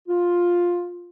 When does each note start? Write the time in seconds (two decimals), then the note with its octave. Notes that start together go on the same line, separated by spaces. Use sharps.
0.07 F4